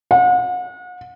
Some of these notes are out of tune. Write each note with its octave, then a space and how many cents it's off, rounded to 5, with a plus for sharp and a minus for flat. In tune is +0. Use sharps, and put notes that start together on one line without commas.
F#5 -40